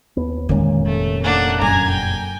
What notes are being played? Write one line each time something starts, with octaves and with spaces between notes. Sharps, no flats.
D#2 B3
F1 A#2 D#3 G#3 C#4
A3
A3 A#3 D4 F#5
F#2 G#5 A#5 G#6
G5